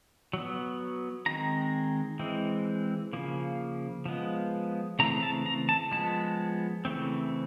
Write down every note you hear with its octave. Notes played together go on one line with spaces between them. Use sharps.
F#3 B3
D#3 G#3 C4 A#5
E3 G#3 C4
C#3 F3 A#3
F3 G#3 B3
C#3 E3 A3 C4 A#5
A5
A#5
A5
F3 G#3 B3 A5
C#3 E3 A3 C4